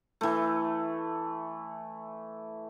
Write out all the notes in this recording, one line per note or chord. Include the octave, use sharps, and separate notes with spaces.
E3 A3